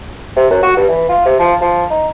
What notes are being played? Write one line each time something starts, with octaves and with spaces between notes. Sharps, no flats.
C3
F#2
F#4
G2
E3
F4
C3
F3
F3
D#4